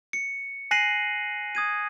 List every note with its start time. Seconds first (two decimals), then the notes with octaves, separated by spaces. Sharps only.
0.13 C#7
0.71 G#5 F#6 A#6 C7 D#7 F#7
1.55 D#6 G#6 D#7